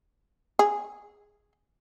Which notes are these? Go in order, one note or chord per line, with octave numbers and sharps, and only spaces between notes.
G#4